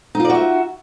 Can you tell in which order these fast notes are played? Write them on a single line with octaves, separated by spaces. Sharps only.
D#4 F4 D5 F#4 E5